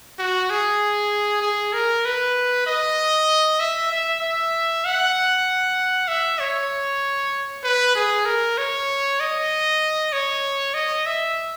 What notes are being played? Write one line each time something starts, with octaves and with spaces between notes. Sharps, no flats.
F#4
G#4
G#4
A#4
B4
D#5
E5
E5
E5
F#5
E5
C#5
B4
G#4
A#4
C#5
D#5
C#5
D#5
E5